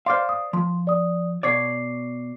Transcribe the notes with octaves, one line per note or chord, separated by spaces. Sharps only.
C5 D5 F5 C6 D6 F6
D#6
F3 C6
D5 D#6
B2 C#5 D5 D6 C7